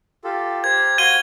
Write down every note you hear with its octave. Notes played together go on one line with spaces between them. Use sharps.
F4 G4 A4
G4 A#4 C5 G#6
F#4 C5 F5 G#6 D#7 G7